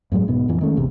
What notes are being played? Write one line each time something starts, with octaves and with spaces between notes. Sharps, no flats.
F#2 A2 F#3 G#3
E1 G#2 B2 B3
A1 F2 E3
D#3 G#3 A3 C#4
D#1 G#1 E2 C3